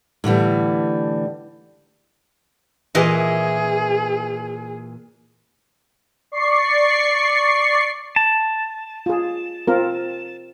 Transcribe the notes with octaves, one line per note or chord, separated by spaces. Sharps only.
A2 D3 E3 G3
A#2 E3 G#4 D#5
D5 C#6 C7
A5
F4 G#4
C4 F4 A#4